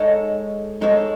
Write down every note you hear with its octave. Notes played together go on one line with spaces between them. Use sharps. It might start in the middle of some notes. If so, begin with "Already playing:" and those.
Already playing: G#3 D#4 A4 C#5
G#3 D#4 A4 C#5